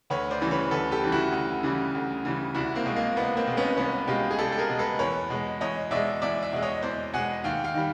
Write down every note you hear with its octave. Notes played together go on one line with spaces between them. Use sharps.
D2 B4 C#5
C5 D5
C#3 E3 G3
B4 C#5
D2 A4 B4
G4 A4
C#3 E3 G3
E4 F#4
D2
C#3 E3 G3
D2
C#3 E3 G3
C2 E4 F#4
A#3 C4
B2 G#3
A#3
C2 B3
A#3 C4
B2 G#3
B3 C#4
C2 B3 C#4
B2 G#3 F4 G4
G#4
C2 G4 A4
A4
G#4 A#4
B2 G#3
A4 B4
E2 B4 C#5
B2 G#3
E2 C#5 D#5
B2 G#3 D5 E5
E2 D5 E5
D5 E5
B2 G#3
C#5 D#5
E2 C5 D5
B2 G#3 F#5 G#5
D#2 F5 G5
F5 G5
D#3 G3